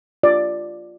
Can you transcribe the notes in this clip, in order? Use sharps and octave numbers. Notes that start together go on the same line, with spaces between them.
F4 D5